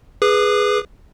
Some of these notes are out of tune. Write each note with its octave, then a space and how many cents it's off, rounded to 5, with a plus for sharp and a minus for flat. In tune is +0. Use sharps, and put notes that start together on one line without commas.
G#4 +0 B4 +0 D6 +35